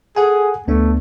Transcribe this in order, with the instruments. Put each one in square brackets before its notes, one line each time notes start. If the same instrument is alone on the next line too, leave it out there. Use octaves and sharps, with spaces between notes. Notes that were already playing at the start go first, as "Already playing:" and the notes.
[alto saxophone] G#4 [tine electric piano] A4 F#5 G#5
[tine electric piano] D2 B3 D4 [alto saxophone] A3